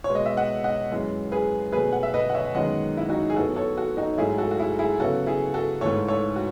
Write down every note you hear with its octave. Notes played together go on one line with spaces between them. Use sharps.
C#5
B2 G#3 B3
D#5
E5
D#5 F#5
D#5 F#5
F#2 E3 G#3
G#4 B4
B2 F#3 A3 G#4 B4
F#5
E5
B4 D#5
F#5
C#5 E5
F#2 D#3 G#3 B3 D#5 F#5
E4
D#4 F#4
G#4
A2 F#3 B3 F#4 A4
A4 C#5
F#4 A4
D#4 F#4
G#2 F#3 A3 E4 G#4
F#4 A4
F#4
E4 G#4
E4 G#4
C#3 F#3 B3 F#4 A4
E4 G#4
F#4 A4
G#2 E3 A3 A4 C#5
A4 C#5
F#4